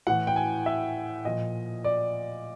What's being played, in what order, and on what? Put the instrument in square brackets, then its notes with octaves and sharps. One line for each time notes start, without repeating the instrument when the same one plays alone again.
[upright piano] A2 E3 F#5
G5
G#5
E5
A#2 F3 D#5
D5